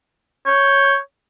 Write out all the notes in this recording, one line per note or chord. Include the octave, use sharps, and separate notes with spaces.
C#5 G6